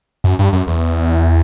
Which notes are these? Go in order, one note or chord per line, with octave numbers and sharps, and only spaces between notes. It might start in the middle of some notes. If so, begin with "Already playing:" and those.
F#2
G2
F#2
E2